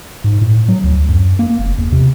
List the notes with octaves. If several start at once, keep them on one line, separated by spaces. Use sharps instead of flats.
G#2
A2
F#3
D2
F#2
A#3
F#1
E2
C3